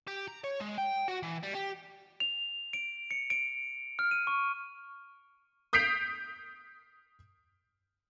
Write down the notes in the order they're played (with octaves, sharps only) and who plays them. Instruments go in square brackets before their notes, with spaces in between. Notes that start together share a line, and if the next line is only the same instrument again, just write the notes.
[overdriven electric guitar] G4
A#5
C#5
G#3
G5
F#4
E3
G3
G4
[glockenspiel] F7
D7
C#7
D7
F6
D#7
C#6
[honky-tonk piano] D#6 G6 B6 C7 D7 F7